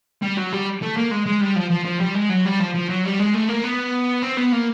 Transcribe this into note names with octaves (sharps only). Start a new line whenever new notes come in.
G3
F#3
G3
A3
A#3
G#3
G#3
G3
F3
F3
F3
G3
G#3
F#3
G3
F3
F3
F#3
G3
G#3
A3
A#3
B3
C4
B3
A#3